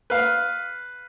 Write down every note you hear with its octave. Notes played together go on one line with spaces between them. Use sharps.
B4 F5